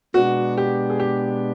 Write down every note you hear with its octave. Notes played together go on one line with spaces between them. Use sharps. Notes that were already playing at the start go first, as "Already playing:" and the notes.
B2 G#3 B3 D4 F#4
G4
G#4
G4